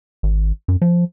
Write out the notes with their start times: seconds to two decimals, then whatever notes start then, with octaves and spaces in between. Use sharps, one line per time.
0.23 G#1
0.68 F#2
0.82 F3